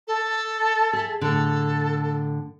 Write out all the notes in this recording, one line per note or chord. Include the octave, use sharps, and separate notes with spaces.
A4
G#4 E5
A2 D3 A4